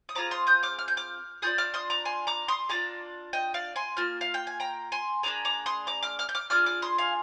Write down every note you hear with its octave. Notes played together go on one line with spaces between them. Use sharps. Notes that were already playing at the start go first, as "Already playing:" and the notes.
D#6
C4 F4 G#4 A#5 D6
C6 D#6
D#6 G6
D6 F6
F6
G6
D6 F6
D4 F4 G#4 D#6 G6
D6 F6
C6 D#6
A#5 D6
G#5 C6
A#5 D6
C6 D#6
D4 F4 G#4 A#5 D6
D#5 G5
D5 F5
G#5 C6
A#3 F4 F6
F5
G5
G#5
G5 A#5
G#5 C6
A#3 D4 F4 G#4 A#5 D6
A#5 D6
C6 D#6
A#5 D6
D6 F6
D6 F6
G6
D6 F6
D4 F4 G#4 D6 F6
D6 F6
C6 D#6
F5 G#5